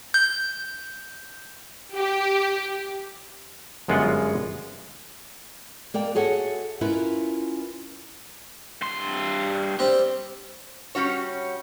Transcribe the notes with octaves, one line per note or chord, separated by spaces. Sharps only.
G6
G4
G1 F#2 G#3 B3 F4 F#5
A#3 A#4 D5 G5
F#4 G#4 A4 C#5 E5 F#5
C#4 E4 F4 A#4 B4
G2 C6
G3 C4 G4
G3 C#4 F#4 C#5